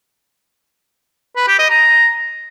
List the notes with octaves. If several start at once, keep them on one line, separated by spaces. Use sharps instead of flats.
B4
G4
D#5
A#5